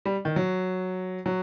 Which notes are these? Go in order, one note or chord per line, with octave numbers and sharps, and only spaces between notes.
G3
D#3
F#3
F#3